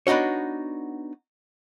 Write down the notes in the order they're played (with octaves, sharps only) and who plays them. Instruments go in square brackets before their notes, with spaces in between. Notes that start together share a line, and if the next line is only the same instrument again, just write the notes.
[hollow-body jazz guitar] B3 D4 D#4 F#4 C#5